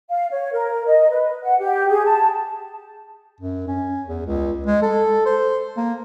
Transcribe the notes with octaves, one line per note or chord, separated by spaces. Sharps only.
F5
C#5
A#4
D#5
B4
F#5
G4
G#4
A5
F#2
C#4
E2
C#2
G#3
A4
C5
A#3